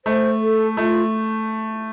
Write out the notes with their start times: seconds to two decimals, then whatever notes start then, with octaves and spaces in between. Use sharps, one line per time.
0.05 A3 C5
0.41 A4
0.77 A3 F4